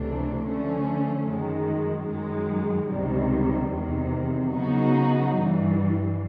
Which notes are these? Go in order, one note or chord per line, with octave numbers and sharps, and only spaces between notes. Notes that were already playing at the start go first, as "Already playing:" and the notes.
Already playing: C#2 C3 E3 A3 D4
D3 F3 A3 C#4
F#2 D#3 G#3
F#2 D#3 G#3
C#2 C3 D#3 G3
E2 C3 D#3
C#3 F#3 B3 D#4 F#4
G2 E3 G3